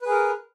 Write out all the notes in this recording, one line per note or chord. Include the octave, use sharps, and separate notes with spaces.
G#4 A#4 B4